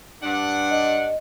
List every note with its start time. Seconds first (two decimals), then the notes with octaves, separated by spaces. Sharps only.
0.23 G2 D4 F#5
0.71 D#5